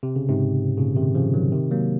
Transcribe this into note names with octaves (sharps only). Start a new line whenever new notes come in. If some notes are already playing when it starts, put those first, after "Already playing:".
C3
C#3
G#2 C3
A#2 C#3
C3 D#3
C#3 F3
D#3 F#3
C3 D#3
F#3 A#3